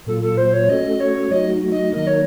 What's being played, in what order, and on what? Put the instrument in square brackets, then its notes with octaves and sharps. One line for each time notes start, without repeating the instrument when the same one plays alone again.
[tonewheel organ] A#2 F#3 A#3 F4 [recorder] A4
[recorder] A4
C5
C#5
[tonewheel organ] A3 C#4 F#4 A4 [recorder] D#5
[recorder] C#5
[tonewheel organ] F#3 A3 D#4 F#4 [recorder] D#5
[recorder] D#5
[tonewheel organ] D#3 F#3 A#3 D#4 A#4 [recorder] D#5
[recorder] C#5